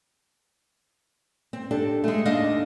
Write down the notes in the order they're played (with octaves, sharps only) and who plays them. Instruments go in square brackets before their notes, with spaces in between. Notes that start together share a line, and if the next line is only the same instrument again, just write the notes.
[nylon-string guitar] C4
D4 G4 A4
G#3 A3
D#2 D4 D#5 F5